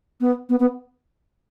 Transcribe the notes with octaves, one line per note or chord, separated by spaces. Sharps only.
B3
B3
B3